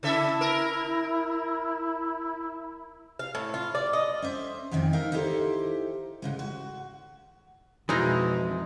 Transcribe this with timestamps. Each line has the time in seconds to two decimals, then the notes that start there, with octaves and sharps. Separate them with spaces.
0.03 C#3 E4 A4 E5
0.41 A#4
3.19 F5
3.35 A2
3.54 F4
3.75 D5
3.93 D#5
4.22 C#4 C5 E5
4.72 F2 G#2 D#3 E3 C4
4.93 D#4 A#4 E5 F5
5.12 D#4 E4 G4 A4 C5
6.22 G#2 C#3 G#3
6.39 F#4
7.89 F2 B2 E3 G#3 D#4 A#5